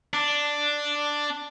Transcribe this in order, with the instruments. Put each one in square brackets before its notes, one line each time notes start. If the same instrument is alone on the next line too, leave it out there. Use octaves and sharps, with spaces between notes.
[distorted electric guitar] D4